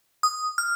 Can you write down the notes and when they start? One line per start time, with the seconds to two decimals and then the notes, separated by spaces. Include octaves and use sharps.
0.23 D#6
0.58 F6